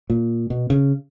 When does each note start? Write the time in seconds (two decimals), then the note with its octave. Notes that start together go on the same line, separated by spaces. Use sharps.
0.10 A#2
0.50 B2
0.70 C#3